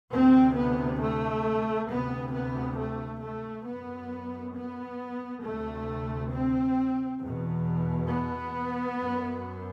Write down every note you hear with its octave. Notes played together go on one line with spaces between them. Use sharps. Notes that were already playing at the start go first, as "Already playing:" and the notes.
D2 C3 C4
B3
A3
D2 C3 B3
B3
A3
A3
F#2 B3
B3
D2 C3 A3
C4
E2 B2
B3
F#2